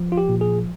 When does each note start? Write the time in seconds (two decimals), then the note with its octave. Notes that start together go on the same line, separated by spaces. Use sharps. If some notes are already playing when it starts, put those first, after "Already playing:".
Already playing: F3
0.12 F4
0.17 G4
0.29 A#2
0.41 G#4